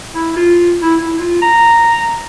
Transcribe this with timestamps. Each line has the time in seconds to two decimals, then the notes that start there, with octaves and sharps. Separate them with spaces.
0.15 E4
0.36 F4
0.82 E4
1.02 E4
1.19 F4
1.42 A#5